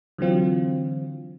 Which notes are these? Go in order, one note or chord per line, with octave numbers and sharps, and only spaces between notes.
D3 E3 F#3 C4 F4